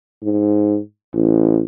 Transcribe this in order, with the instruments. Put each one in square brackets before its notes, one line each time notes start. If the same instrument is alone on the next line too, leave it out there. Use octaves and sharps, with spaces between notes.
[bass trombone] G#2
A1